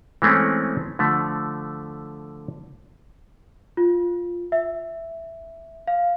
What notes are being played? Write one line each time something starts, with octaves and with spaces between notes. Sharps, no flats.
E3 G#3 A3 C4 C#4
D3 F3 A3
F4
E5
F5